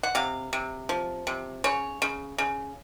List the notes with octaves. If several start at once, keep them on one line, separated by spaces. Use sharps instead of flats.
F#5
C3 F5
C3
F3
C3
C#3 C#5
C#3
C#3